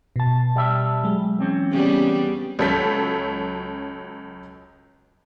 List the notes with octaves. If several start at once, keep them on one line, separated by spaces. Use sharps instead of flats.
B2 A5
G3 E5
F#3 G#3
E2 C4 C#4
C#3 G3 B3
C#2 F#3 C#4 A4 G6 B6